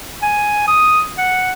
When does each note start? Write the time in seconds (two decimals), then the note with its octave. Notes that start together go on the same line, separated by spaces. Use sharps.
0.22 G#5
0.67 D#6
1.18 F#5